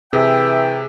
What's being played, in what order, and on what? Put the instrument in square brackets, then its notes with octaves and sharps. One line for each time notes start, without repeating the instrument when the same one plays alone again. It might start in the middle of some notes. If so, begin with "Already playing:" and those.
[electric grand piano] C3 [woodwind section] E3 G5 [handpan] G#4 [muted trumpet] E5